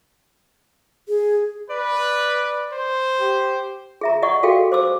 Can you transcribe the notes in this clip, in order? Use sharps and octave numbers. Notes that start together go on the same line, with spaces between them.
G#4
B4 D5
C5
G4
G#4 E5 A#5
D5 D#5 F#5 C#6
F#4 G#4 A4 F5 G5
C5 D6 E6